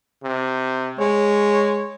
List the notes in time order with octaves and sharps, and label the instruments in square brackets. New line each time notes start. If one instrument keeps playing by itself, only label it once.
[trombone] C3
[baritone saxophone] G#3 [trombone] C#5